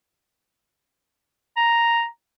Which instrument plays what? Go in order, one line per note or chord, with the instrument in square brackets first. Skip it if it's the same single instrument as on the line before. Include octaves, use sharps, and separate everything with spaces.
[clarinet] A#5